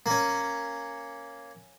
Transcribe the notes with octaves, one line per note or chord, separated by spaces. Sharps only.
A#3 C#4